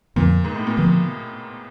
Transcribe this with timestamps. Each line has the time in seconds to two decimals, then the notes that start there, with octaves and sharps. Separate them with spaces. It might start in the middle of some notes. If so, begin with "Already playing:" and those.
0.16 F2 A#2 D3 F3
0.44 G#2
0.56 A2
0.67 A#2
0.77 B2 D3 F3